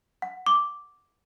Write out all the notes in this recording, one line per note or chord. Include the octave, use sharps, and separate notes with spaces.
F#5
D6